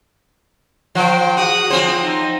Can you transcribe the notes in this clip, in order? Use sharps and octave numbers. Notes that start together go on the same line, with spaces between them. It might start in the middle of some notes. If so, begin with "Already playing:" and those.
F3 C5 G5
F#4 G#4 D#6 F#6
F3 C4 C5
D#4